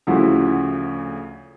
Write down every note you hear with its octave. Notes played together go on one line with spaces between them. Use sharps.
D2 C#3 F3 E4 F#4